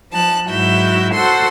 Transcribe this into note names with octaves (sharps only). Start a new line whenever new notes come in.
F3 A5 F#6
G#2 F#3 E4 F#4 E5 G6
F#4 A4 C5 F#5 C6 E6